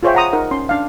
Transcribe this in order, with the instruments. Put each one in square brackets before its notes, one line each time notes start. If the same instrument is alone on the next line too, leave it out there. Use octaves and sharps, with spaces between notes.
[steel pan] F4 G#4 C5 C#5 E5 G5
F#5 A#5 D#6
D#4 A#4 F#5
C#4 C6
D4 F5